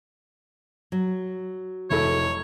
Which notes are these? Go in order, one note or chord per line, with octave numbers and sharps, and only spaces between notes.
F#3
F1 E4 A4 C#5